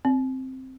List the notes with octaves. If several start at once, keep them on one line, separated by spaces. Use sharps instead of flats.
C4